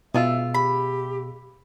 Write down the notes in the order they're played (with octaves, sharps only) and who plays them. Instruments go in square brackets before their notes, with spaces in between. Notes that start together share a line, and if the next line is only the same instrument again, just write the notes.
[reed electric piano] B2 E6 [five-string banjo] G#3 F4 [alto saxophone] E5
[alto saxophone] G4 [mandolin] B5